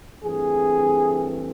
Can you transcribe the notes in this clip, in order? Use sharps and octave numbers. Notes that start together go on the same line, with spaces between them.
G2 E3 A3 C4 G#4